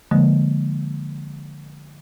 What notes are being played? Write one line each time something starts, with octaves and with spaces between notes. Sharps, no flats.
D3 F3 G#3 A#3